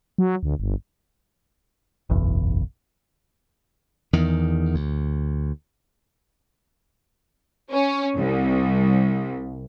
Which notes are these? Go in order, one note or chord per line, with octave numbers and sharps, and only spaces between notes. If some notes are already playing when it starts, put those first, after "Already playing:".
F#3
D2
G1
F#1 B1 E2
E2 D#3
D2
C#4
C2